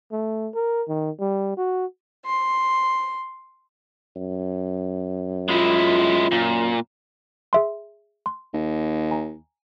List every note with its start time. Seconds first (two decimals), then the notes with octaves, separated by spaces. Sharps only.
0.12 A3
0.54 A#4
0.88 D#3
1.20 G3
1.57 F#4
2.25 C6
4.16 F#2
5.49 G#3 E4 F4
6.32 F#2 A#2
7.53 G#4 E5 C6
8.26 C6
8.53 D#2
9.11 G#5 A#5